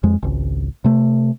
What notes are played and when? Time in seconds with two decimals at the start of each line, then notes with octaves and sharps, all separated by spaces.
0.03 F2 G#3
0.22 G#1 C#2
0.84 C3 A3